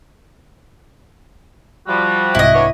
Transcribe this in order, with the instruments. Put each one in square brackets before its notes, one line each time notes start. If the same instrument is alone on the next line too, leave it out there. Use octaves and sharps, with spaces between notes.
[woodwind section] F3 G3 [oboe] F#4
[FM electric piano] C2 G#2 C3 [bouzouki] E4 D#5
[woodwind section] B3 D4 C#5